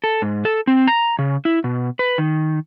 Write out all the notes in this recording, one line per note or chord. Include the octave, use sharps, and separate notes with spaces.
A4
G#2
A4
C4
A#5
C#3
E4
B2
B4
D#3